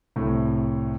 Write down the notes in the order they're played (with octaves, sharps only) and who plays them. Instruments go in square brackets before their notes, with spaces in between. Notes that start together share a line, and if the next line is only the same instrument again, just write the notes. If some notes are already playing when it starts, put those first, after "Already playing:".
[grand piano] C2 A2